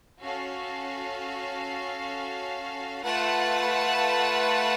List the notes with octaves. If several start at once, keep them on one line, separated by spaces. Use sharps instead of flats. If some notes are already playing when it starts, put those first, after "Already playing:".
C#4 F#4 A4 F5
A3 F4 B4 F#5 A5